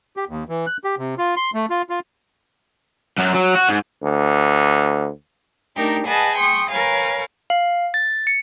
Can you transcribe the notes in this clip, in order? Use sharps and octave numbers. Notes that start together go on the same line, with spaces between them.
G4
D#2
E3
F#6
G4
C3
F4
C6
A3
F4
F4
F#2 F#3
F#3
F#4
G#2
D2
A3 D4 D#4 G4 A#4
G#4 B4 D#5 F#5 A5
G5 C6 C#6 D#6
A#4 B4 C#5 F5 G#5
F5
A6
C#7